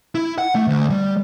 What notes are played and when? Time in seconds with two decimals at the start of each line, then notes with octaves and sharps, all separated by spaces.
0.15 E4
0.38 F#5
0.55 A3
0.67 D2
0.90 G3